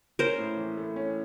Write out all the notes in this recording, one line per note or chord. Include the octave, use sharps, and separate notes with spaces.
C#4 A#4 C5
A2
E3
A3
C#4